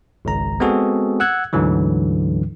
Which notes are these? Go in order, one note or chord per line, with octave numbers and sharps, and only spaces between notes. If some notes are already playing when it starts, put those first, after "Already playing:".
G#1 C#2 A#5
G#3 B3 C4 F#4 G#4 A4
F#5 E6 F#6 G#6
D2 G#2 D3 E3 F#3